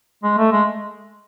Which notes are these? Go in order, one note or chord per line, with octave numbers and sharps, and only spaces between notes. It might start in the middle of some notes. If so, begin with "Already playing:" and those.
G#3
A3
G#3